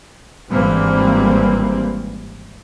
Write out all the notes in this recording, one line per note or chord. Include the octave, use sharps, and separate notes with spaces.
G#1 G2 E3 G3 A#3 C4